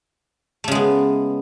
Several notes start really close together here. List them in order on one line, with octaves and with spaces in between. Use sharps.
A3 C#3 G#3 B3